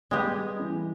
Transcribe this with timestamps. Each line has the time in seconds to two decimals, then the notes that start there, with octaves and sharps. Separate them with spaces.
0.11 G3 G#3 B3 G4
0.60 E3